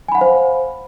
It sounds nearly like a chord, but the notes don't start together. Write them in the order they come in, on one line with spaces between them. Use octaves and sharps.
G#5 B5 F#5 F5 C5